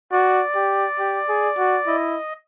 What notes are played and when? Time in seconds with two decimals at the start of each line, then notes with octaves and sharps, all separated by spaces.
0.12 F#4 D5
0.55 G4
0.99 G4
1.29 G#4
1.58 F#4
1.87 E4 D#5